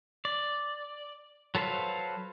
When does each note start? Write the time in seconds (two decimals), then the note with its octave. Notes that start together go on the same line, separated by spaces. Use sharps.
0.25 D5
1.55 F#3 A4 B4 C5 F5